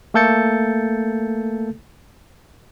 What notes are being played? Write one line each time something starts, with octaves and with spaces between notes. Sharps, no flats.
A3 A#3 A4 G6 A6 C#7